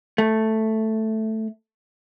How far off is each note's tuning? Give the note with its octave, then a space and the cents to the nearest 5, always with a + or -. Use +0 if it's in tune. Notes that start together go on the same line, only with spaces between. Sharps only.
A3 +0